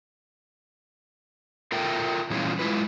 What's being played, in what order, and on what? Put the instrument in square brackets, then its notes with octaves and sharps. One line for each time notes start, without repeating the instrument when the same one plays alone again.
[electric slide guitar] F4 A4 A#4 E5 G5
A#2 E3 G3 C#4 E4 F4
G#3 E4 F4 B4